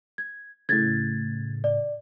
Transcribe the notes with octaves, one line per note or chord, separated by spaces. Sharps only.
G#6
A2 C#3 G#6 A6
D5